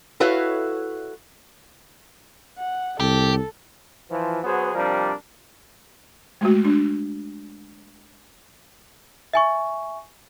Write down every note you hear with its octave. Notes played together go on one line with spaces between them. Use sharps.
E4 F#4 A4 B4 C#5 F5
F#5
C2 G4 A4
E3 F3
F#3 B3 F#4 G#4 C5
C3 F3 G3 D4 A#4
G#3 A3 F#4
D4
E5 G#5 C#6